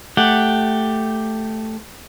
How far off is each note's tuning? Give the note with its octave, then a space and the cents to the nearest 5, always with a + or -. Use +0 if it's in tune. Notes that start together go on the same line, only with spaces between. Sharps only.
A3 +0 G4 +0 F#5 +0